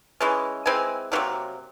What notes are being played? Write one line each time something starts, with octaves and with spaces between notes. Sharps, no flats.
E3 G#3 C#4
E3 G#3 C4 G#5
C3 D#3 F#3 A#3